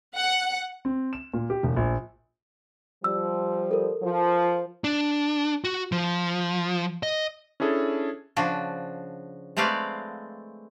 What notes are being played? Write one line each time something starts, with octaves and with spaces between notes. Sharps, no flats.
F#5
C4
E7
A#2
G4
E1
A#1
F3 G3 E6
A4 A#4
F3
D4
F#4
F3
D#5
C#4 D4 E4 G#4 A4
C#3 F3 D4 F#4
G#3 A3 C4 B4 D5 F5